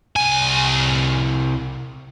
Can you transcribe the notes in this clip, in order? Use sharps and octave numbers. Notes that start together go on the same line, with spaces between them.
C2 G#5